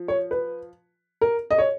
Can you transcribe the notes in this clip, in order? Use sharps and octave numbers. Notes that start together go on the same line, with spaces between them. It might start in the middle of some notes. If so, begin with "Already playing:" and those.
Already playing: F3
C#5
B4
A#4
D#5
C#5